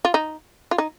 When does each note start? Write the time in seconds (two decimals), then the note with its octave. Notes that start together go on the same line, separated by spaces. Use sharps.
0.05 F4
0.14 D#4
0.71 F4
0.78 D#4